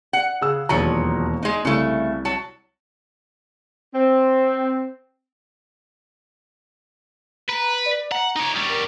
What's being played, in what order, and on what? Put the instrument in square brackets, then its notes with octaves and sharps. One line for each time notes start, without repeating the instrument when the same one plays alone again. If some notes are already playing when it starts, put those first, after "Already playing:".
[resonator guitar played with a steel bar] F#5
[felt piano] C#3 G#4 E6
[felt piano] E1 D#2 A#5 [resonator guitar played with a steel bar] F3 F#3
[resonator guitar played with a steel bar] G#3 D#4
[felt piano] C2 [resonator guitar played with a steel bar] C#3 A3
[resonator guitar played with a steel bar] F#3 A5
[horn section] C4
[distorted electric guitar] B4 [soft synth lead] A#5
[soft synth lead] D5
[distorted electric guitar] F#5 [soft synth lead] A#5
[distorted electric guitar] D#4 C#5
G3 C#4
[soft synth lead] A#4